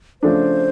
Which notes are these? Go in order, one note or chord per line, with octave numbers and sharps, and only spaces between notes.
C#3 F3 A3 D4 C5